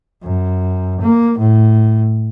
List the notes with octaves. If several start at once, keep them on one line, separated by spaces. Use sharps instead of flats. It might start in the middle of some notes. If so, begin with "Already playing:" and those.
F#2
A#3
A2